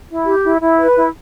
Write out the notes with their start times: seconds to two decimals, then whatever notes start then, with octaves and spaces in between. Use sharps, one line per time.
0.09 E4
0.26 G4
0.43 E4
0.61 E4
0.79 B4
0.96 E4